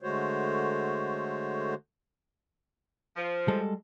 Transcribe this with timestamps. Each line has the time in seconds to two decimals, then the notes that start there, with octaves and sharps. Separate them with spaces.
0.02 D3 G#3 A3 F#4 C5 C#5
3.16 F3
3.48 G3 G#3 A4